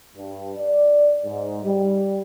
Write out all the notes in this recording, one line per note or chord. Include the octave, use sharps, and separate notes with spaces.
G2
D5
G#2
G3